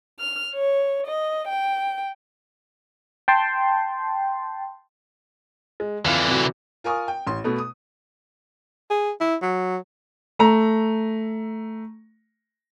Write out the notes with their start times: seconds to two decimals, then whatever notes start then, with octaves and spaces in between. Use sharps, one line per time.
0.20 F6
0.54 C#5
1.08 D#5
1.47 G5
3.28 G5 A5 C6
5.80 G#3
6.05 F2 D3 E3 F5 F6
6.28 C3 F#4
6.84 F4 A#4 G#5 C#6 D#6
7.08 G5
7.27 A1 C6
7.44 B2 A3 B3
7.58 D#6
8.90 G#4
9.20 E4
9.42 F#3
10.39 A3 A#5